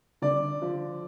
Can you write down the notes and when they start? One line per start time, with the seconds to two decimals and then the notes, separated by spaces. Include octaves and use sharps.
0.22 D3 D5
0.62 F3